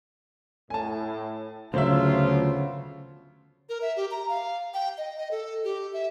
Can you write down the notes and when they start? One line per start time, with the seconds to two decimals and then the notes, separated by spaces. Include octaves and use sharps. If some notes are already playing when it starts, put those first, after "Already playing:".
0.70 A2 G#5 A5
1.74 D2 C#3 F3 F#3 B3 F4 C5 E5
3.69 A#4
3.82 E5
3.97 G4
4.11 A#5
4.29 F5
4.74 G5
4.98 D#5
5.17 D#5
5.31 A4
5.64 G4
5.93 E5